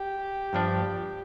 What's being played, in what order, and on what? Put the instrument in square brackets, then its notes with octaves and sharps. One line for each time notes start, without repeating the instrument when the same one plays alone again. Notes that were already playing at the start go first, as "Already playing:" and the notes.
Already playing: [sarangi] G4
[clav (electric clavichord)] G2 F3 D4